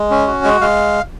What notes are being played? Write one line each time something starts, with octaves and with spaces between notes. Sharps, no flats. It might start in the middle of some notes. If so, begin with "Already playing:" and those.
Already playing: G#3
C#4
F#4
G#3
G#3 F5